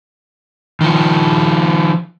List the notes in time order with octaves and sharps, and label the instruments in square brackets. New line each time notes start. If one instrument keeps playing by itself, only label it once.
[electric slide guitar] D#3 F3